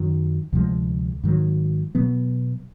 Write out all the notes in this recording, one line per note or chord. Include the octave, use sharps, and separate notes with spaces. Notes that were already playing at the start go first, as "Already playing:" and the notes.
Already playing: F#2 D#3 F#3
D2 C3 F3 G#3
G#2 D#3 F#3
B2 F#3 B3